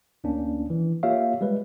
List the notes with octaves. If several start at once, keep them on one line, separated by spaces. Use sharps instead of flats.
D2 A#3 C#4 D4
E3
A#3 F4 G4 C#5 E5 F5
G3 G#3 B4